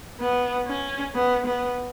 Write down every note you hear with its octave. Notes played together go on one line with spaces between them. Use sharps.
B3
C#4
B3
B3